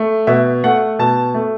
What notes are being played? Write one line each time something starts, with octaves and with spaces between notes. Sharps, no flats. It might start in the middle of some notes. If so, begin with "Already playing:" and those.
Already playing: A3
B2 E5
A3 F#5
B2 A5
A3